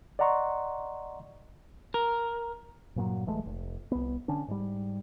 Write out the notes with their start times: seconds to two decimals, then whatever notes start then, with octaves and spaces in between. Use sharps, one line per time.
0.19 D5 D#5 F#5 A#5 C6 C#6
1.94 A#4
2.96 G2 A#2 F#3
3.26 D1 E3 G#3 A3
3.46 F1
3.92 C2 B3
4.28 D3 C#4 D4
4.48 G#2 G3